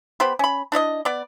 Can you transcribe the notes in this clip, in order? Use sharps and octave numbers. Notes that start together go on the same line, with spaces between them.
B3 G4 C5 B5
C#4 B5
D4 E4 D5 D#5
B3 D5